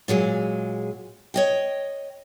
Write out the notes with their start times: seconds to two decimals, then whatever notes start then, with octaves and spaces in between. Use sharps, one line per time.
0.08 A#2 F#3 G#3 G#4
1.34 C#5 D#5 G5